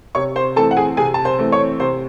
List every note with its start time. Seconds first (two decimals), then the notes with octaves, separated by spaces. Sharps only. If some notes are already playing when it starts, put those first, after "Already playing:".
0.15 C3 C#5 C#6
0.36 C5 C6
0.56 E3 A3 C4 A4 A5
0.71 F#5
0.77 G#4 G#5
0.97 C3 G#4 G#5
1.14 A5
1.25 C5 C6
1.38 E3 A3 C4
1.52 C#5 C#6
1.80 C3 C5 C6